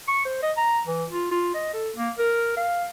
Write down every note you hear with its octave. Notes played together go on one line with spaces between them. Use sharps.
C#6
C5
D#5
A#5
E3
F4
F4
D#5
A4
A#3
A#4
F5